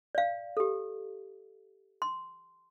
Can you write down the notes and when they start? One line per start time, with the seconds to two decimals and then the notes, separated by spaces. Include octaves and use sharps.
0.15 D5 F5
0.57 G4 A4
2.02 C6